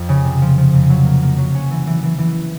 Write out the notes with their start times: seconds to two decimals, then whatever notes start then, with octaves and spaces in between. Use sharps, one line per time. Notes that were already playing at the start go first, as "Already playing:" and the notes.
Already playing: F2
0.09 C#3
0.25 C3
0.42 F3
0.58 F3
0.73 F2
0.90 F#3
1.05 A#3
1.22 A#3
1.38 F#3
1.55 C#4
1.71 E3
1.87 E3
2.03 E3
2.18 E3